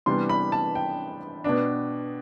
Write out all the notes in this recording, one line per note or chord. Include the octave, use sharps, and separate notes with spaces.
C3 E3 G3 B3 D4 C6
B5
A5
G5
B2 B3 D4